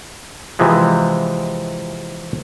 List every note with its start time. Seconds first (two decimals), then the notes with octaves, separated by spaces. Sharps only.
0.59 C3 E3 F3 G#3